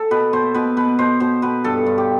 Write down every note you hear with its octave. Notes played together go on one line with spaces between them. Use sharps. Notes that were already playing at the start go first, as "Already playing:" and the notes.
Already playing: A4
B2 B4
B2 C5
B2 B4
B2 B4
B2 C5
B2 C5
B2 B4
G2 A4
G2
G4